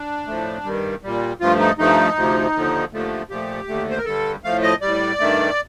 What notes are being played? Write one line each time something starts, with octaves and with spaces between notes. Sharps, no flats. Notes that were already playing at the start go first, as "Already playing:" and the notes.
Already playing: D4
A2 F3 A3
G2 D#3 G3
A#2 G3
G2 F3 A3 F4
D#4
G2 F3 A3 D#4
D2 C3 F3
D#2 D3 F3
D#2 D3 F3 A3
A#2 F3 A3 G4
D#2 D3 A3
C5
A#4
G2 D3 G3 A4
A2 F3 A3 F5
D#5
A2 G3 D5
G2 D#3 A3